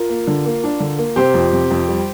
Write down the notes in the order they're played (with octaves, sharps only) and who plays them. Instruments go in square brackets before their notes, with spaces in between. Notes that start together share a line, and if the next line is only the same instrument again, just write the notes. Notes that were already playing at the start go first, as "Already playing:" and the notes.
Already playing: [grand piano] F4 A#4
A#3
D3
A#3
D4
D3
A#3
C3 G4 C5
F2
C3
F2
G3